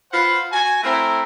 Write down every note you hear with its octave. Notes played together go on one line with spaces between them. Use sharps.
F4 B4 C5 F#5
F#4 G#5
A3 C4 E4 A#4